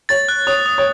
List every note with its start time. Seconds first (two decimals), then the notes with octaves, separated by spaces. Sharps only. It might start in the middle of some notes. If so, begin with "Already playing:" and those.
0.09 C#5 A6
0.29 F#6
0.47 C#5 D#6
0.66 D#6
0.78 C#5